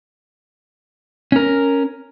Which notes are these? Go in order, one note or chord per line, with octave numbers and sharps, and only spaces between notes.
C#4 A#4